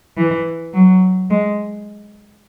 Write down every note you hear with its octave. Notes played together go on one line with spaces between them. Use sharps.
E3
F#3
G#3